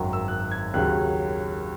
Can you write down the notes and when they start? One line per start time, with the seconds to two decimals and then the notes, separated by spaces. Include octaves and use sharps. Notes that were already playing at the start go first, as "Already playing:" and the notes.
Already playing: G#1 F#2 D#3 F#3
0.13 E6
0.28 F#6
0.52 G#6
0.74 D#2 C#3 F#3 F#6